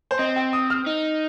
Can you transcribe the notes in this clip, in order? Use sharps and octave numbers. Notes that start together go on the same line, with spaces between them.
C5
C4 D#5
G5
D#6
F6
D#4